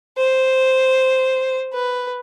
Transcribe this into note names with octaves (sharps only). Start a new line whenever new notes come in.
C5
B4